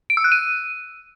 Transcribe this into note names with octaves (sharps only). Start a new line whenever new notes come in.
D7
E6
F#6
D#7